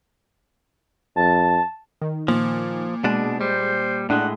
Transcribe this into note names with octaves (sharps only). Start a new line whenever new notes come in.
F2 A5
D#3
A#2 F3
B2 G#3 D4
G3 C5
A2 G#3 D4 F#5